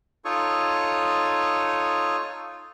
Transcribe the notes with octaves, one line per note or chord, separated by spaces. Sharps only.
D#4 F4 A4 C#5 C#6 D#6